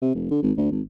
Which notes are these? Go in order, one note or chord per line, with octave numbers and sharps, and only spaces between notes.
C3
F1
D3
G#1
D2
G#1